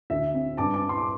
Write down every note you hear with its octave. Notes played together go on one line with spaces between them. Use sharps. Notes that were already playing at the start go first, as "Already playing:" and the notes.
D2 E5
C4
G2 A5 D6
A5 D6
G2
C6
D6